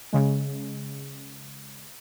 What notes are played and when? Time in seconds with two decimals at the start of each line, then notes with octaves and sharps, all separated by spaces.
0.13 C#3 G#3